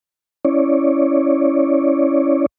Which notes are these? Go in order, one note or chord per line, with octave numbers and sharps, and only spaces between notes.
C#4 E4 C#5 D5